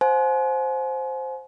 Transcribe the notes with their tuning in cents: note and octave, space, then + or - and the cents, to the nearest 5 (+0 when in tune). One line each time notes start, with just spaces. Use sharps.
C5 +0 F5 +45 G#5 +35